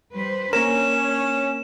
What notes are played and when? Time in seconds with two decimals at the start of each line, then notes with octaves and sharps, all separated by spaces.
0.14 G3 B4 C5
0.53 A#3 C#4 D4 A#4 E7